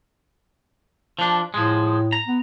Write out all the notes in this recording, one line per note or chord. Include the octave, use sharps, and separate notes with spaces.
F3 D4
A2 F3 G#3
A#5
B3